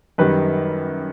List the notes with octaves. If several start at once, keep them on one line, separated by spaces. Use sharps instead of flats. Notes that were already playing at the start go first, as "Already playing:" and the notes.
F#2 D#3 G3 B4